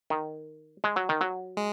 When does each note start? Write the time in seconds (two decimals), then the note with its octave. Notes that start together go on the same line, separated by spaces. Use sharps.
0.10 D#3
0.84 G#3
0.96 F#3
1.09 D#3
1.21 F#3
1.57 G#3